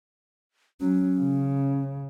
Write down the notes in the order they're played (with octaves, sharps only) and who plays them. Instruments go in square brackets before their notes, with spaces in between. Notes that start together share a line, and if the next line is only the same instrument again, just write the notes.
[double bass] F#3 [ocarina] C#4
[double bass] C#3